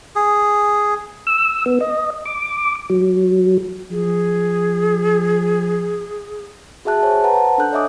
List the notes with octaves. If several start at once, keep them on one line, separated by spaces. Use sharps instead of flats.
G#4
E6
B3
D#5
D6
F#3
F3 G#4
F#4 G#4 E5 A5 F#6
C5 C#5 G#5
B4 C5 F#5 A5 A#5
D4 A4 F#6 G6
C#5 D#5 E5 G#5 D6 D#6